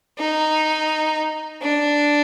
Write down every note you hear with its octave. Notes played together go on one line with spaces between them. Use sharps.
D#4
D4